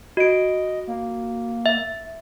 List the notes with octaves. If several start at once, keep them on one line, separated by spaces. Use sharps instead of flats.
F#4 D#5 D7
A#3
E5